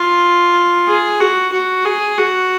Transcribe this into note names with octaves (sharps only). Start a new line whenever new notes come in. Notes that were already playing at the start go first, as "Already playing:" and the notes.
Already playing: F4
G#4
F#4
F#4
G#4
F#4